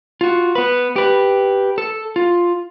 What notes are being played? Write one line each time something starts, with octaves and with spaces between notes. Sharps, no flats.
F4 F#4
B3 B4
G4 B4
A4
F4